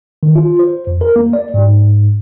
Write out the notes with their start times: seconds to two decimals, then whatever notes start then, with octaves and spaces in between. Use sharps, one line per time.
0.23 D#3
0.35 F4
0.59 C5
0.87 F2
1.01 A#4
1.16 A#3
1.33 D5
1.54 G#2